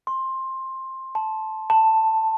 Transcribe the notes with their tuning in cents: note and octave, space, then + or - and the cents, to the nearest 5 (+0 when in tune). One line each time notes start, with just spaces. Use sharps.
C6 +15
A5 -10
A5 +10